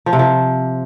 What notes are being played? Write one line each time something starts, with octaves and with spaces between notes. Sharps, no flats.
F3
C3
F3